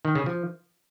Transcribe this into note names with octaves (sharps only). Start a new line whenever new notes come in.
D#3
C#3
F3